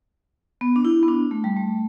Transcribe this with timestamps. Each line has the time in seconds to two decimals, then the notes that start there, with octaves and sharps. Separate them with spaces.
0.61 B3
0.76 D4
0.85 E4
1.03 B3
1.08 D4
1.31 A3
1.44 G3
1.57 A3